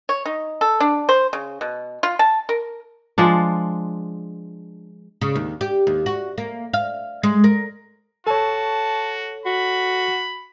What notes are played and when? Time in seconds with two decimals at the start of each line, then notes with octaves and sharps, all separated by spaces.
0.09 C#5
0.25 D#4
0.61 A4
0.80 D4
1.09 C5
1.33 C#3
1.61 B2
2.03 F4
2.19 A5
2.49 A#4
3.18 F3 G#3 D4
5.21 C#3
5.35 D#2
5.61 G4
5.87 D#2
6.06 F#4
6.38 A#3
6.73 F5
7.23 G#3
7.44 A#4
8.27 F#4 A4 C#5 A5
9.46 F#4 B5